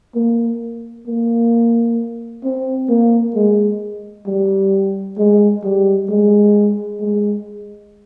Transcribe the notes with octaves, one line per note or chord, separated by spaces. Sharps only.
A#3
A#3
C4
A#3
G#3
G3
G#3
G3
G#3
G#3